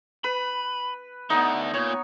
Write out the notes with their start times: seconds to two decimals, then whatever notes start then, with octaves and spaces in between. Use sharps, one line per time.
0.24 B4 B5
1.30 D3 A3 B3 D#4
1.74 A#2 C#5